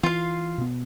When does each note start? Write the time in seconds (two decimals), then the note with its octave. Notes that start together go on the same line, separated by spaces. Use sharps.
0.03 E3 F4 F5
0.58 B2 B3